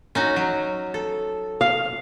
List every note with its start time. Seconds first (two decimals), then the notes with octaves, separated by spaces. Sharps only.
0.15 C#4 D#4 F#4
0.36 F#3
0.94 A4
1.61 F5